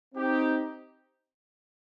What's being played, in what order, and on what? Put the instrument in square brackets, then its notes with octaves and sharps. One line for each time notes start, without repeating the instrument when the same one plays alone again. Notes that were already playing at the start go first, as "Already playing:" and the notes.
[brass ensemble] C4 D#4 G4